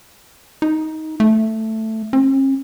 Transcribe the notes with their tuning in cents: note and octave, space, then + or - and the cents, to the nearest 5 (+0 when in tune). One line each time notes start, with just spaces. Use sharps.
D#4 +15
A3 +5
C#4 -45